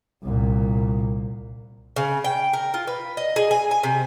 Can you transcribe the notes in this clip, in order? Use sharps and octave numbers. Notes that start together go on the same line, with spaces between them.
C2 A#2
C#3
G5
A#4
F4
B4
D#5
G#4
G#5
G#5
C3